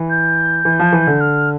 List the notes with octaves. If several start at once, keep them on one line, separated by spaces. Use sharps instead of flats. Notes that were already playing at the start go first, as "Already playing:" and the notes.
Already playing: E3
G6
E3
F3
E3
D3
F6